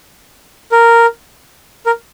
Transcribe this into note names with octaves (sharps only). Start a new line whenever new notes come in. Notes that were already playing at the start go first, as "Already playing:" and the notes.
A#4
A#4